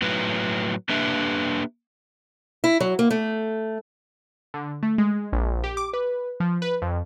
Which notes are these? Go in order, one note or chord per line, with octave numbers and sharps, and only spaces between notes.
A2 F#3 B4
A#3 D4 G4 B4 E5
E4
F#3
A#3
A3
D3
A3
G#3
A#1
G4
D6
B4
F3
B4
F2